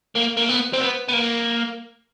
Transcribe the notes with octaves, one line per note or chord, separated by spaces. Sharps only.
A#3
A#3
B3
C4
B3
B3
A#3